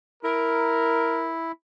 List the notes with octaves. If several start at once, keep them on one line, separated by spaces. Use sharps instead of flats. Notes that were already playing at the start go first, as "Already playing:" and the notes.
E4 A#4